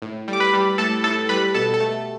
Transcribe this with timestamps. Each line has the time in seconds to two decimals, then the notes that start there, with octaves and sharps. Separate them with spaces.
0.02 A2
0.28 G3
0.33 D6
0.40 B4 B5
0.53 G3
0.78 A2 A4 A5
1.04 A2 A4 A5
1.29 G3 B4 B5
1.54 B2 A4 A5
1.74 A4 A5
1.80 A3